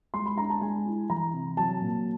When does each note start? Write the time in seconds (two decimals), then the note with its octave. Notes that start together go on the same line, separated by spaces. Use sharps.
0.13 G#3 C6
0.26 B5
0.37 D4 A#5
0.50 A5
0.61 G#3 G#5
0.85 E4
1.10 E3 A#5
1.34 C3
1.57 F#3 A5
1.81 A#2